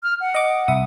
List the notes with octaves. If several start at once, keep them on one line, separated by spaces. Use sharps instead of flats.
F6
F#5
D#5 D6
C2 E5 D#6